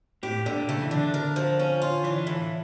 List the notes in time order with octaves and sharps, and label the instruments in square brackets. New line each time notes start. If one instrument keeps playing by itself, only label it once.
[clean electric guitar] A2 [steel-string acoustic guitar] G4
[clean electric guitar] A#2 [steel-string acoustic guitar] D3
[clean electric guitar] C#3 [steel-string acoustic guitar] A3
[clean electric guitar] E3
[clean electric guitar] D3 [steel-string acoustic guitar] D4
[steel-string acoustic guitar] A#4
F3
C#4
F4
[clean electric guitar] E3 [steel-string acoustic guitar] D4
[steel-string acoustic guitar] A2 [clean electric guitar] E3